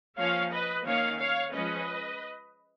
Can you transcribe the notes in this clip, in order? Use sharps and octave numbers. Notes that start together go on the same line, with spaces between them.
F3 A#3 C#4 C#5 F5
B4 D#5
D#3 A#3 C#4 C#5 F5
C#5 F5
F3 G#3 C#4 B4 D#5